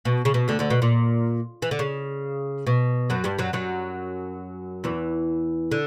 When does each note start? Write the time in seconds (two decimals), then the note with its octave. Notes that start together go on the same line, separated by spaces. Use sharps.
0.05 B2
0.25 C#3
0.34 B2
0.48 D2 D3
0.59 D2 D3
0.70 B2
0.82 A#2
1.62 E3
1.71 D3
1.79 C#3
2.67 B2
3.10 F#2 F#3
3.24 G2 G3
3.38 F#2 F#3
3.53 F#2 F#3
4.84 E2 E3
5.71 D3